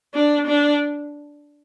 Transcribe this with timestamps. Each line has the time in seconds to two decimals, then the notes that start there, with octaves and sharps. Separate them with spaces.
0.14 D4
0.47 D4